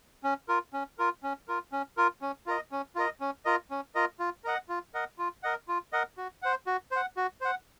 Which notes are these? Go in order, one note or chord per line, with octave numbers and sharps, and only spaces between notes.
C#4
F4 A#4
C#4
F4 A#4
C#4
F4 A#4
C#4
F4 A#4
C#4
F4 A#4 D#5
C#4
F4 A#4 D#5
C#4
F4 A#4 D#5
C#4
F4 A#4 D#5
F4
A#4 D#5 F#5
F4
A#4 D#5 F#5
F4
A#4 D#5 F#5
F4
A#4 D#5 F#5
F#4
C5 F#5
F#4
C5 F#5
F#4
C5 F#5